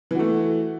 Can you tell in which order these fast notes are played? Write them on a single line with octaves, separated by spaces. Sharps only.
E3 F#4 A3